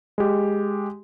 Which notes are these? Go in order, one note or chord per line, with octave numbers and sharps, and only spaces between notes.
G#3 G4